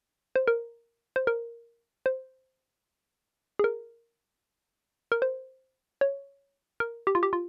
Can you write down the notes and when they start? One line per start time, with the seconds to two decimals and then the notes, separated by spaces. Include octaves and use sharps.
0.36 C5
0.48 A#4
1.16 C5
1.27 A#4
2.06 C5
3.59 G#4
3.64 A#4
5.12 A#4
5.22 C5
6.01 C#5
6.80 A#4
7.07 G4
7.15 F4
7.23 G4
7.33 F4